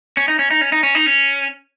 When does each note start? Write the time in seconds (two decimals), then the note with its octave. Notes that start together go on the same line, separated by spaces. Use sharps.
0.17 C#4
0.28 D#4
0.39 C#4
0.51 D#4
0.61 C#4
0.72 D#4
0.83 C#4
0.95 D#4
1.06 C#4